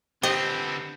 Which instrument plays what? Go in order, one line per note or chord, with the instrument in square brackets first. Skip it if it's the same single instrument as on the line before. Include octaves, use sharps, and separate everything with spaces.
[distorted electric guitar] D3 B3 [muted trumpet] C4 [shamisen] G4 C5 [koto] D#5